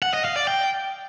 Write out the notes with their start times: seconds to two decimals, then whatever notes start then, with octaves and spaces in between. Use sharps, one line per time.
0.03 F#5
0.14 D#5
0.25 F5
0.36 D5
0.47 G5